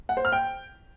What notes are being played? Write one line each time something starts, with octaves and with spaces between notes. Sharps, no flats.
F#5
C5
F6
G5